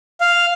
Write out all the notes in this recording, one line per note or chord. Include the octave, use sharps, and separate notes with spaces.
F5